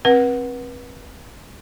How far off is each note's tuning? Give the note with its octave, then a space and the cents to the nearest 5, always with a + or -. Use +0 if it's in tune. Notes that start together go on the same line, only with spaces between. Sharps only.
C4 +25 B4 -30 F#5 +0